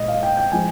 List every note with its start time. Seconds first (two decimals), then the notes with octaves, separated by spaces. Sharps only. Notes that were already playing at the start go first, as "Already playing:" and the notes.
Already playing: A#2 G#3 D#5
0.08 F5
0.23 G5
0.37 G5
0.52 F3 G#3 G#5